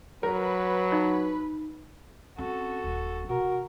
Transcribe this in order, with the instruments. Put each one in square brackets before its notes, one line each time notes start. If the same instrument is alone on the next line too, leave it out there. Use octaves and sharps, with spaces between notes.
[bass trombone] F#3 [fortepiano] A#4 [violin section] B4
[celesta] D#4
[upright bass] C4 C#4 [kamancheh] F#4 A4
[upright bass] D#1
[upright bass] C3 [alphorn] F#4 [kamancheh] A#4